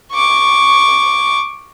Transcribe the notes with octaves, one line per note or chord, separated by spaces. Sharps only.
C#6 D6